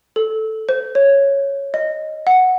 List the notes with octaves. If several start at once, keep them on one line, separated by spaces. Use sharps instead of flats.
A4
C5
C#5
D#5
F#5